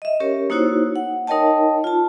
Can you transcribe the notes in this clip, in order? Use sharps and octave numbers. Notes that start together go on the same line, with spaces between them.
D#5 E5
C#4 G4 A#4 C#5
A#3 D#4 E4 F#4 C5 C#5
F#5
D#4 A#4 C#5 D#5 G5 A5
F4 A5